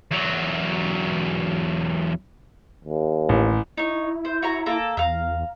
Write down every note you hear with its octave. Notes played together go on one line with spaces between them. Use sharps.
E2 F#3
D#2
A1
D#4 E4 C#5
C5
F#4 C#5 A#5
A#3 A4 A#5
E2 E5 F5 A#5